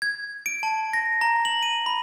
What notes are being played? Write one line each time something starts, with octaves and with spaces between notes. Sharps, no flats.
G#6
D7
A5
A#6
A#5
F#7
D#7
B5